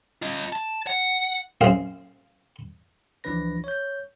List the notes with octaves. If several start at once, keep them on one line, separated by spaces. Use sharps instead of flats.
F4 D#5
A5
F#5
F#2 A#2 C4 G#4 F5
C#2 E3 F3 D4 B4 A#6
C#5 G6